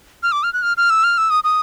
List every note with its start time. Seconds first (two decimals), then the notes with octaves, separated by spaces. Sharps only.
0.23 F6
0.32 D6
0.43 F6
0.53 F#6
0.62 F6
0.77 F6
0.90 E6
1.04 F6
1.18 E6
1.30 D#6
1.44 D#6